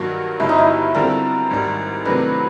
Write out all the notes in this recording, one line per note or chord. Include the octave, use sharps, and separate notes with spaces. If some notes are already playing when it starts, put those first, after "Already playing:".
Already playing: G2 D#3 F#3 A#3 F#4
G1 G2 E3 G#3 E4
D#4
E4
D3 G3 C4 F4 A4 A#4
A1 G#2 D#3 G3
C3 D#3 F#3 A3 D4 B4